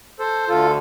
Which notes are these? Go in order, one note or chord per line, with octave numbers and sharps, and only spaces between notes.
A4 C5
D2 D3 F4 A4